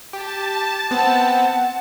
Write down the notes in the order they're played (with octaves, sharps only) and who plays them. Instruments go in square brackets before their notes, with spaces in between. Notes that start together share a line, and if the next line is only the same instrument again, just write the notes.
[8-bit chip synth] G4 [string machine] A5
[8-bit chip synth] B3 C4 [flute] F#5